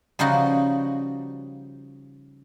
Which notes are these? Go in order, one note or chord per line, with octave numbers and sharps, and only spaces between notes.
C#3 F3 G3 D#4 F#4